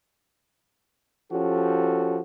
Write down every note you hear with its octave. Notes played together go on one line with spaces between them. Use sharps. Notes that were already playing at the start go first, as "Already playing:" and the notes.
F3 C#4 F#4 G4 A4